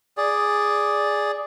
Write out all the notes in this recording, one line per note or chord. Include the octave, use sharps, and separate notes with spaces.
G#4 D5